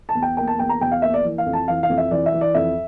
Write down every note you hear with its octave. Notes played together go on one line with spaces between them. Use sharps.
A5
E2
G5
A#3 G5
A5
E2 G5
A#5
E2 G5
F5
A#3 E5
D5
E3
F5
F2
A5
E3 F5
F5
F2
E5
E3 D5
E5
E3
D5
F2 E5